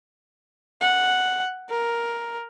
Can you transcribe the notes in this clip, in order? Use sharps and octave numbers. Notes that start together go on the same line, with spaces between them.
F#5
A#4